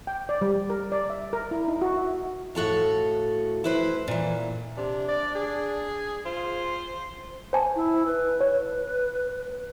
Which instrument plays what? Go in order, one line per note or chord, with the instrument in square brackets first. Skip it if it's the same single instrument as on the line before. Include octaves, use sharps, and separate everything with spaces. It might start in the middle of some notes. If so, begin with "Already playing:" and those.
[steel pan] G5
D5
G3
A#4
D5
E5
A#4
E4
D#4
F#4
E5
[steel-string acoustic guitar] A2 F#4 A4 F5
E4 B4 C5
A#2 E3
[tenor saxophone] C3 [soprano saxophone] D4
[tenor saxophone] D5
G#4
[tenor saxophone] F4 [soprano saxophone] C5
[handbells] C5 G#5 A5
[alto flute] E4
B4
[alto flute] B4 [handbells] C#5